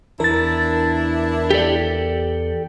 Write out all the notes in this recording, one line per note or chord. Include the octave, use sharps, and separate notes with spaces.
E2 D4 E4 A#4 A6
G4 A4 D5